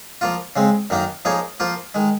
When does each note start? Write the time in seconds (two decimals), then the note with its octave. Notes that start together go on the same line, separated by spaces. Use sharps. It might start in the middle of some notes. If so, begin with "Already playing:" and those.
0.21 F3 A#3 F4
0.56 C#3 G#3 C4
0.90 F#2 D#3 A#3 D#4
1.25 F3 A#3 D#4 G#4 C#5
1.60 F3 A#3 F4 C5
1.94 D#3 G#3